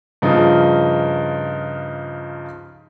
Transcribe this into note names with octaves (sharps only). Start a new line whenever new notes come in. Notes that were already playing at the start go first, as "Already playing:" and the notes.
G2 C#3 F3 D#4